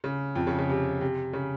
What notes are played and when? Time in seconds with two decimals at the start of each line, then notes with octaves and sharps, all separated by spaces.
0.04 C#3
0.35 F2 F3
0.47 C#3
0.58 C#3
0.69 C3
1.01 C3
1.33 C#3